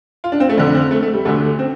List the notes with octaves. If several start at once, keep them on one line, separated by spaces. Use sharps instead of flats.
F4
D4
C4
A3
F2 D3 D4
C4
A3
A3
G3
D2 D3 A3
C4